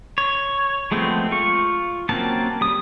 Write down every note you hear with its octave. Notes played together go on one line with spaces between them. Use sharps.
C#5
F3 G#3 A3 B3 C4
F4 C#6
F#3 A#3 C4 C#4 A5
G3 D#6